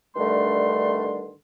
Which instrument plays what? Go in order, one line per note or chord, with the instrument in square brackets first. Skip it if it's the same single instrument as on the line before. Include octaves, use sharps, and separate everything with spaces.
[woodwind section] G2 D3 D#3 G3 A3 C6